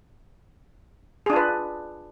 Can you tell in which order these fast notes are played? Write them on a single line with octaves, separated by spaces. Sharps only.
G#4 D4 F4 B4